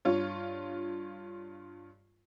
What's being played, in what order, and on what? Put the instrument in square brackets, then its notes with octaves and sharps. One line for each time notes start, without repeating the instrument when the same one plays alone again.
[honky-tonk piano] G2 F4 C#5